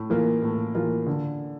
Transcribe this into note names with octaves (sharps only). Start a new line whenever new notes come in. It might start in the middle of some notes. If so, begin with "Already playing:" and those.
Already playing: A2
E3 A#3 F4
A2
E3 A#3 F4
D3